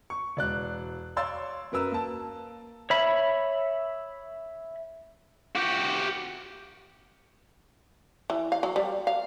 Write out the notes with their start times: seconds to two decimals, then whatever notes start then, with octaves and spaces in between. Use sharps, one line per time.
0.10 C#6
0.37 E1 D5 F#6
1.16 C#5 D5 F5 C6 E6 A6
1.72 F#2 A#4 B4 E6
1.92 A#3 A5
2.90 C#5 E5 B5
5.55 F#4 G4
8.30 E3
8.52 F5
8.63 F#3
8.76 G3
9.07 F5